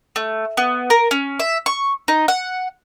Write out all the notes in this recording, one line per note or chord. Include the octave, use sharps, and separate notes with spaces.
A3
B3
A#4
C#4
E5
C#6
D#4
F#5